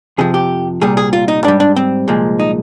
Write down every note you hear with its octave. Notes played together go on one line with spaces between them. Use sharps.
F2 C3 F3 G#4
G4
C2 A#2 G3 G#4
G#4
F4
D#4
G#2 G3 D4
D4
C4
C2 A#2 F3 G#3
D#4